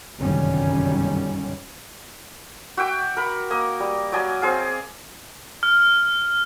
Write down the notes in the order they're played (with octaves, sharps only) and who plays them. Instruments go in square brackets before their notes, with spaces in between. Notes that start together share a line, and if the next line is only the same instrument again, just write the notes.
[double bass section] G1 C2 F#2 D#3 G3 C#4
[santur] F#4 E5 G5 D6
A#4 B5
A#3 D#5
G3
F#3 D5 D#5 G#5
C4 G#4 F5
[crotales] F6